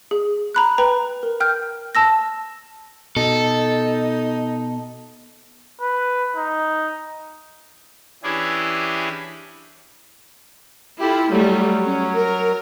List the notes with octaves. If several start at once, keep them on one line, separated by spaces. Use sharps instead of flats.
G#4
A#5 B5 F#6
B4 G5 A#5 B5
A#4
G5 F6 G6
A5 E6 A#6
B2 D#4 A4
B4
D#4
E3 C#4 D4 E4 G4 G#4
E4 F4 G4 A4
F#3 G3 A3
C#4
A#4